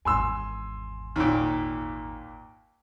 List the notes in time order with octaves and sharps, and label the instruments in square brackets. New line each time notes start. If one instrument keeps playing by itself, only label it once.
[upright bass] G#1 E2 [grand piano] G#5 C6 E6
[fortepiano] D#2 A#2